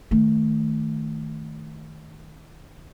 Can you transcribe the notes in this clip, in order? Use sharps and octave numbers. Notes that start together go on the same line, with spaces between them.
D#3 A3